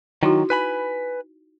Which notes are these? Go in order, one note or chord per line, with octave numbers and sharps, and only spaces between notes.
D#3 F#3 D#4 E4 F#4
B4 G#5 B5